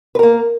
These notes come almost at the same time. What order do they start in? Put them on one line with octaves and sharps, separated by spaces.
B4 A#4 A#3